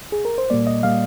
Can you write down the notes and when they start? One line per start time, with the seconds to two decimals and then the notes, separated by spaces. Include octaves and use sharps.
0.12 G#4
0.25 A#4
0.38 C5
0.50 A#2 G3 A#3 D5
0.67 D#5
0.83 A#2 G3 A#3 F5